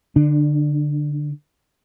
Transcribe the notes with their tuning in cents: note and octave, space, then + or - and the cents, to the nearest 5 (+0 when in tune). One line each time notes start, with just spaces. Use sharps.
D3 +0 D4 +30